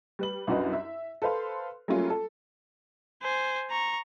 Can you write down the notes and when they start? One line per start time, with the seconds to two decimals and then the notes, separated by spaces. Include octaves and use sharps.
0.19 G3 B4 F#7
0.47 C2 F#2 D4 F#4 B4 D#5
0.73 E5
1.22 A4 B4 C5 F5 C6
1.88 F#3 G3 A3 A#3 C#4 F4
2.10 A4
3.22 C5 G#5
3.70 A#5 C#6